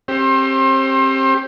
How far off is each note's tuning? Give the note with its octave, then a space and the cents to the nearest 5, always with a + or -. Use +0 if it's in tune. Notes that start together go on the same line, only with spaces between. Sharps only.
C4 +35 G4 +5 C5 +30